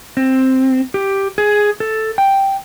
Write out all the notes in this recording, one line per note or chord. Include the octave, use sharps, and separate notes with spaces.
C4
G4
G#4
A4
G5